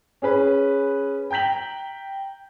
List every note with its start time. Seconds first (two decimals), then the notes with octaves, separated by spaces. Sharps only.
0.22 C#4 G#4 B4 B5
1.31 G5 A#5 G6 B6 F#7